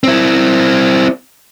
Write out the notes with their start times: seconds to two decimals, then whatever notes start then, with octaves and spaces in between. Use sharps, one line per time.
0.04 C4 E4